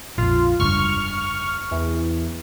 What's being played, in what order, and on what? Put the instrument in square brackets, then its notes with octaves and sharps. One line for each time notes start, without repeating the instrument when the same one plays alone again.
[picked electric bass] A#1 F2 [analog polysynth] F4
[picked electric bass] F1 C#2 G2 [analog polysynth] C#6 F6
[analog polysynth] E2